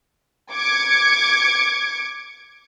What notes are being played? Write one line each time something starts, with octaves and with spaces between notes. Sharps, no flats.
D6 G#6 C#7